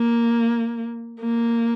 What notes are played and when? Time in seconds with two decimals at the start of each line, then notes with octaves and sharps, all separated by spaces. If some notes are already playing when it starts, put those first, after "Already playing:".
Already playing: A#3
1.21 A#3